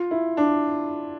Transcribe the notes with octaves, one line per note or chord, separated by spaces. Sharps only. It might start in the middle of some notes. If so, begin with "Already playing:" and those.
Already playing: F4
E4
D4